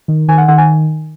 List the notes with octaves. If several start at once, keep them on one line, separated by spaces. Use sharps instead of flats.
D#3
D#3 G#5
F#5
D#3 F#5
G#5